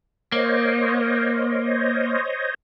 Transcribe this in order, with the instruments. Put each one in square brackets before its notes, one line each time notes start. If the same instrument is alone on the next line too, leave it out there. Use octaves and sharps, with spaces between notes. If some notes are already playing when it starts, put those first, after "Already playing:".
[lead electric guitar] A#3 [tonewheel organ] C5 C#5 D#5